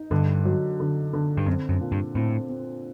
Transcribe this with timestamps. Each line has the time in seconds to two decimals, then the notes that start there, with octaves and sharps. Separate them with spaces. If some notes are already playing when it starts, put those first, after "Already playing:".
Already playing: D#4
0.11 G2 D3
0.45 F#3
0.80 D3
1.13 D3
1.37 G2
1.46 F#2 C4
1.69 F#2
1.81 A#2
1.92 G2
2.15 A2 C4
2.49 C4